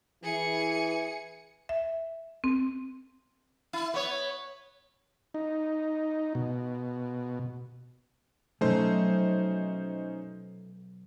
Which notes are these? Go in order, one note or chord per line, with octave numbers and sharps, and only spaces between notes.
E3 G#4 C#7
E5
C4
E4
B3 C#5
D#4
B2
B2 F#3 A3 C#4 D#4 C5